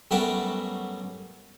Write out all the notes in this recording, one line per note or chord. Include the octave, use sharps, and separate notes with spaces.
F#2 G3 A3 B3 F#4 D6